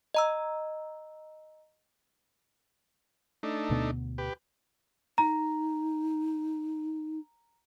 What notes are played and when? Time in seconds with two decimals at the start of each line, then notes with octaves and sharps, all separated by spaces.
0.15 D#5 A#5 E6
3.43 A3 D4 D#4
3.70 D2 B2 B3
4.18 G4 B4
5.18 D#4 A#5